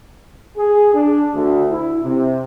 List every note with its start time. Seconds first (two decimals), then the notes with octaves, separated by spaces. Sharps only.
0.58 G#4
0.95 D4
1.35 D2
1.71 E4
2.03 C3